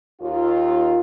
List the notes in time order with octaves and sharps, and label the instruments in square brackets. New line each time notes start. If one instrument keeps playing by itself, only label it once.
[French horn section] D#2 F4